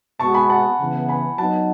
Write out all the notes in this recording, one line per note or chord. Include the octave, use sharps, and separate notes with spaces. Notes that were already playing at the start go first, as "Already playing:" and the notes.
B2 G#3 B3 F#4 A5 C#6
G#5 B5
F#5 A5
C#3 E3 B3
G#5 B5
F#3 B3 D#4 F#5 A5